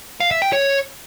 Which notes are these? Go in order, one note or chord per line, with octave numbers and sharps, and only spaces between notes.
F5
E5
G5
C#5